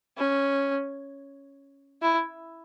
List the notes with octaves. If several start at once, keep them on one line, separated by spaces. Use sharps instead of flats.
C#4
E4